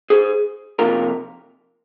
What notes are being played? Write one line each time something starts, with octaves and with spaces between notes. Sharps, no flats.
G#4 C5
F2 C3 F3 A#3 F4 A#4